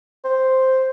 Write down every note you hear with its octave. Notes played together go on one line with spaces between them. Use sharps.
C5